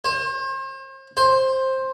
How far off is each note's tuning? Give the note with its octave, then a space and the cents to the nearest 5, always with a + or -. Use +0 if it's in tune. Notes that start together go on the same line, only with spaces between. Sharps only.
C5 +40
C5 +10